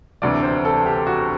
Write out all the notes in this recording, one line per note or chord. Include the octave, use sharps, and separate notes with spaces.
E1 D2 C3 E3 D5
C5
A4
G4
F#4